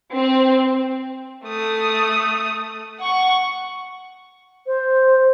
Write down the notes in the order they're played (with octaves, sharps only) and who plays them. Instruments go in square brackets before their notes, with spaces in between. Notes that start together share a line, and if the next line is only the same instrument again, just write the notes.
[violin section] C4
[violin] A3 D#6
F#5 C#6
[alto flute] C5